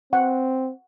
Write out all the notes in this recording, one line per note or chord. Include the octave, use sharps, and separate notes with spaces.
C4 F#5